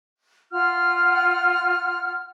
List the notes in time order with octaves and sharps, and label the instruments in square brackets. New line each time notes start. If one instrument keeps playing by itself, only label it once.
[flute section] F4 F#5 F6